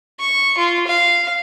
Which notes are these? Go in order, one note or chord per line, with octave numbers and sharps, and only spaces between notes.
C#6
F4
F5